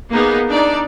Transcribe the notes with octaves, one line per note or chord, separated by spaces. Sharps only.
A#3 B3 D#4 G#4
D4 D#4 D5